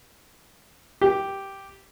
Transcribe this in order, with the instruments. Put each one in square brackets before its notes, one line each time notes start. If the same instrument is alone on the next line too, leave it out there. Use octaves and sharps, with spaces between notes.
[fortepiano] G4